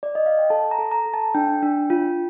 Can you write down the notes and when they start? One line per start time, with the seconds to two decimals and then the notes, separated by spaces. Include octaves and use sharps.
0.03 D5
0.15 D#5
0.26 F5
0.39 G5
0.50 A4 A5
0.71 A#5
0.79 A4
0.91 A#5
1.06 A4
1.14 A5
1.34 D4 G5
1.62 D4
1.90 F4